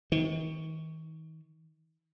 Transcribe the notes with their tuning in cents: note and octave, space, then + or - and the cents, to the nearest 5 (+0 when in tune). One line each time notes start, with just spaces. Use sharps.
D#3 +40